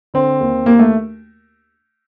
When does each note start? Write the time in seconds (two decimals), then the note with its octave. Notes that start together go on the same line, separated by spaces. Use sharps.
0.14 D3 C4
0.40 D#2
0.66 D#2 A#3
0.79 A3